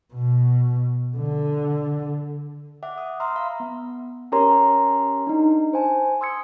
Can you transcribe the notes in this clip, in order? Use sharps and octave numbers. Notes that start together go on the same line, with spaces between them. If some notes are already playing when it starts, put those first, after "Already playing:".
B2
D3
E5 F#5 D6
D#6
E5 A#5 C6 E6 F6
F5 A#5 B5
B3
C#4 G4 A#4 C#5 A#5 C6
D4 D#4
C5 G#5 A5
C6 D#6 E6 G#6 C#7